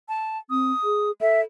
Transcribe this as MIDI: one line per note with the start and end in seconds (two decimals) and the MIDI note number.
0.09 0.38 81
0.50 0.72 60
0.50 1.10 87
0.84 1.12 68
1.21 1.44 69
1.21 1.41 76